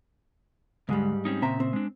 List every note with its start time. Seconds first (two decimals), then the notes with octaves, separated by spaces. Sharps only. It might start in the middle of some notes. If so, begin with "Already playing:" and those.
0.89 D2 G#2 G3 G#3
1.25 C4 C#4 D#4
1.42 A#2 C#3 C4 E5 A#5
1.60 C4
1.73 G#3 D4